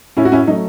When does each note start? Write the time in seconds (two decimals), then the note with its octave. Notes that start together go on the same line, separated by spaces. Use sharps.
0.17 A2 C#4 E4
0.25 F#4
0.32 C#4 E4
0.47 F#3 A3 D#4